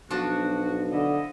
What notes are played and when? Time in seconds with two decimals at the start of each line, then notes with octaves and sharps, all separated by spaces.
0.11 B1 F3 D4 F#4
0.92 D3 E4 A4 D#5